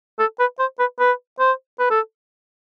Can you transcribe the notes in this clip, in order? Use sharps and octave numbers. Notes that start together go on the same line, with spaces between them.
A4
B4
C5
B4
B4
C5
B4
A4